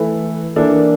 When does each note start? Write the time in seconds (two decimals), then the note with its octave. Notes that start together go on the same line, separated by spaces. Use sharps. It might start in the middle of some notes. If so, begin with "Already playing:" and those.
Already playing: E3 A3 E4 A4
0.56 E3 A#3 D4 A4